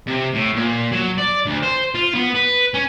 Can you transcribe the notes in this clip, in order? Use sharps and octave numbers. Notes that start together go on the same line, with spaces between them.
C3
A2
A#2
F#3
D5
D2
C5
F4
B3
B4
C#4